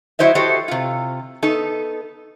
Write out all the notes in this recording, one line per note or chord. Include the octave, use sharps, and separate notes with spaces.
F#3 E4 C5 D#5 E5
F#4 G4 A4 C5 C#5 D#5
C3 F4
B3 D#4 A4